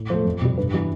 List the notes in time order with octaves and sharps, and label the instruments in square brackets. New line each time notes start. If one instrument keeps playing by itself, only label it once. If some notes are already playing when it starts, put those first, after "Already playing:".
Already playing: [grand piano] A2
F3 A3 C5
F2
C3 G3
G2 B4
E3 G3